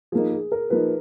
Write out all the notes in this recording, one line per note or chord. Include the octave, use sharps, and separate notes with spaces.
F3 A#3 D#4 G#4
G#4
A#4
F3 A#3 D#4 B4